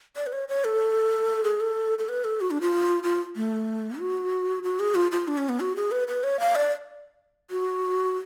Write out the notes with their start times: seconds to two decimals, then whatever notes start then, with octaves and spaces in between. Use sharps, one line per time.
0.16 D5
0.27 B4
0.33 C#5
0.49 C#5
0.64 A4
1.44 G#4
1.60 A4
1.99 A4
2.09 B4
2.24 A4
2.41 F#4
2.51 D4
2.61 F4
3.03 F4
3.36 A3
4.00 F#4
4.63 F#4
4.80 G#4
4.95 F4
5.12 F4
5.28 D4
5.38 C#4
5.49 B3
5.60 F#4
5.76 G#4
5.91 B4
6.08 B4
6.24 C#5
6.40 F5
6.55 D5
7.51 F#4